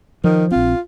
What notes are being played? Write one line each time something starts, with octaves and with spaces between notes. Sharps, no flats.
D#3 F3
A#1 C4 F4